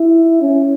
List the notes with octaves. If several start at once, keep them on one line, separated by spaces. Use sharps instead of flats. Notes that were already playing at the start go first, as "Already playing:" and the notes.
Already playing: E4
C#4